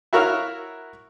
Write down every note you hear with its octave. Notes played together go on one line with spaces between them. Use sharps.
E4 F#4 A#4 C#5 E5 F5